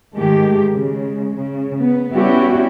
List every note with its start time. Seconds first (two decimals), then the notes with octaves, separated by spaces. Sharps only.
0.15 G#2 D#3 G#3 A3 G4
0.72 C#3 G#3
1.37 C#3
1.80 B3
2.13 G3 B3 C#4 E4 F#4 G4